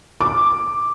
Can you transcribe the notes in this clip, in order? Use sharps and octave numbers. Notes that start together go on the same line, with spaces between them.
D6